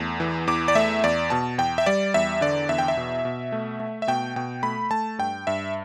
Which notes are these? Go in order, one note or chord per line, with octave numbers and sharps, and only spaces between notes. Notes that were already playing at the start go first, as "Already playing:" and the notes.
Already playing: E2 A3
E3
E2 D6
D5
A3 E5
E2 D5
B2 A5
E2 G5
E5
G3 D5
E2 E5
D3 D5
E2 E5
G5
E5
B2
B2
A3
A3
E5
B2 G5
B2 G5
A3 B5
A3 A5
G2 G5
G2 E5